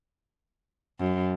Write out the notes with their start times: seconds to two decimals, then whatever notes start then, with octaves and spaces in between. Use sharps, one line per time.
0.99 F#2